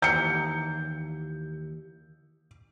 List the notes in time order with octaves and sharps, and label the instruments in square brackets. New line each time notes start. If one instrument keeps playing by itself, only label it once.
[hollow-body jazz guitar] D#2 E3 A#5 [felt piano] G6 C#7